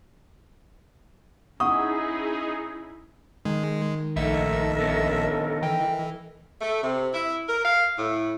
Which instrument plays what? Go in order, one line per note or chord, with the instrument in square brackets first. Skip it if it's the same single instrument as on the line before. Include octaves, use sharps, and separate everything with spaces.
[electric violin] C#4 E4 [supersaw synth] D#4 G#4 [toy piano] F#5 C#6 [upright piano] D#6
[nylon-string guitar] D#3 [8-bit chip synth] G#3
[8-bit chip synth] A#1 E5 [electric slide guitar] A3 D#4 [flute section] A4 A#4 D#5
[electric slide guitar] D3 B3 C#4
[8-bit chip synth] E3 [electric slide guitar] G5
[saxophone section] A3
C3
E4
A#4
F5
A2